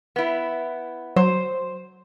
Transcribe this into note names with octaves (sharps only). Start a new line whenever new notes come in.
B3 E4
F#3 C5